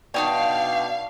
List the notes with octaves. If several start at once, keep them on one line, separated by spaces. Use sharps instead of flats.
B2 D4 D#4 C#5 D5 F5 G5